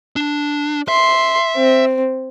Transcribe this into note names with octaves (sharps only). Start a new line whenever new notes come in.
D4
E5 C6
C4